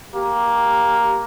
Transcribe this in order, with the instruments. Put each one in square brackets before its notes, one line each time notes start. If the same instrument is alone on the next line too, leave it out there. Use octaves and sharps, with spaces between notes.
[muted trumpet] A#3 [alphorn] G4